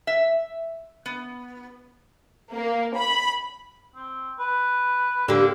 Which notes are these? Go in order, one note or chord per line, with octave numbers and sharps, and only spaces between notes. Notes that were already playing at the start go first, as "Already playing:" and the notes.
E5
B3
A#3
B5
C4
B4
D3 A#3 G4